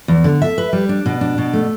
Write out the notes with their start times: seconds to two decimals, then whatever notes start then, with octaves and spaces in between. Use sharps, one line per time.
0.08 E2
0.24 D3
0.42 E5
0.58 B4
0.73 G3
0.89 D4
1.06 B2
1.21 D4
1.38 B2
1.53 A3